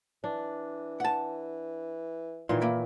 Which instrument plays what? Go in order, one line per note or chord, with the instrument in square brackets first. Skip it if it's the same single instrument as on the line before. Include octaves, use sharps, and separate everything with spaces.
[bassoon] E3 [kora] D4
[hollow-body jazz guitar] F#5 A5
[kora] A#2 D#3 E3 [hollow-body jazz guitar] C6
[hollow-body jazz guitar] A#3 E4